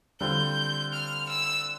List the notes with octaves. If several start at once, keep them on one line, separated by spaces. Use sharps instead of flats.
D3 G3 C4 F4 G6
F6
E6